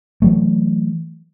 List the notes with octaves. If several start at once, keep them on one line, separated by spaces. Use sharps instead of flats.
E3 F#3 A3